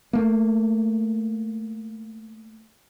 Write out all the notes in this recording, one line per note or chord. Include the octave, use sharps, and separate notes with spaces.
A3 A#3